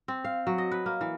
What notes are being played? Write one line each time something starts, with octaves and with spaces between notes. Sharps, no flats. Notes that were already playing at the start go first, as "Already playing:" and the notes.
C4
F5
F#3
D#5
B4
A#3
E3